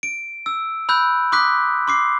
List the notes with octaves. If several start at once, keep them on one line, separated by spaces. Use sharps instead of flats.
D7
E6
B5 E6 F#6 G6
C6 D6 D#6 F#6 B6
C6 D6 C7